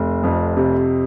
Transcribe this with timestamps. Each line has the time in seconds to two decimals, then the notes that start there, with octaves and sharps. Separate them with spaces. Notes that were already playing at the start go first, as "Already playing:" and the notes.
Already playing: F1
0.23 F2
0.57 C3